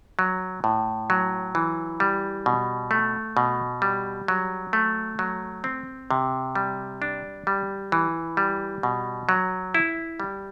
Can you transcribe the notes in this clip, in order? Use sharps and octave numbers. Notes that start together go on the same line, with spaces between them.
F#3
A2
F#3
E3
G3
B2
A3
B2
G3
F#3
A3
F#3
C4
C3
G3
D4
G3
E3
G3
B2
F#3
E4
G3